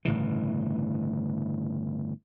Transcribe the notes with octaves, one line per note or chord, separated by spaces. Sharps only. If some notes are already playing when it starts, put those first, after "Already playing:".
G1 A2 C#3 E3